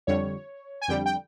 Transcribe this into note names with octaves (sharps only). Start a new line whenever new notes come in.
F2 D3 G3 C#5
G#5
F2 D3 G3 G5
G5